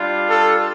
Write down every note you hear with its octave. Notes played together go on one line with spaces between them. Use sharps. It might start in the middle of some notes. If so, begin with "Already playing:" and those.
Already playing: G3 D4 F4
A4